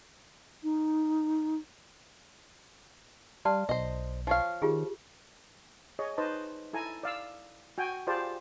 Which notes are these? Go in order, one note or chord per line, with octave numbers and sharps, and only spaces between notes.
D#4
G3 D5 F5 A5 C6
B1 C5 D#5
F3 C#5 F5
D#3 F4 G4 G#4
G#4 C#5 D#5
D#4 B4 C5 D#5 A5
E4 A4 G#5 A#5
D5 F5 E6
F#4 G5 G#5
F4 G4 G#4 C5 D5 A5